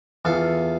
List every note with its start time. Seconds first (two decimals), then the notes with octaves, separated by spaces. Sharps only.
0.25 E2 F4 A4